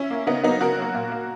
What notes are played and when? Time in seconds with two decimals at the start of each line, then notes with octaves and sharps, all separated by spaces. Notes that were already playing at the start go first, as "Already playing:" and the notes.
Already playing: C#4 E4
0.10 A#3
0.27 C#3 B3 D#4
0.44 F#3 A#3 B3 D#4
0.61 C#3 F#4 A#4
0.77 F#3 A#3
0.94 A#2
1.12 A#3